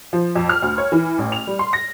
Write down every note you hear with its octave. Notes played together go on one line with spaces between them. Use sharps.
F3
F2
F6
D2
C#5
E3
A1
F7
G3
C6
A#6